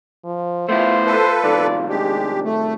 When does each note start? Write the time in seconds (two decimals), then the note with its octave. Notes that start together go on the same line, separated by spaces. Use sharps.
0.24 F3
0.69 A3 B3 E4 F4 C5
1.06 F4 A4 B4
1.43 C2 D#3 D5
1.89 G#3 D4 G4
2.44 A3